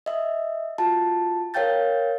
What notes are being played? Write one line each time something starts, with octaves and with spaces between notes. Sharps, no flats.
D#5 E5
F4 F#4 A5
A#4 C#5 F5 G5 G6 A6